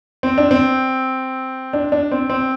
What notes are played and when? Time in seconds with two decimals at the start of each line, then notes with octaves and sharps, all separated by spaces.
0.23 C4
0.38 D4
0.51 C4
1.73 D4
1.92 D4
2.12 C4
2.30 C4